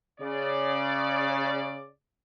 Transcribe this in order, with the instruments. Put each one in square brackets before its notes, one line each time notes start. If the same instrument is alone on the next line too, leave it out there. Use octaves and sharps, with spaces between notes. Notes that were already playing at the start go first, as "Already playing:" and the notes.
[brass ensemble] C#3 D5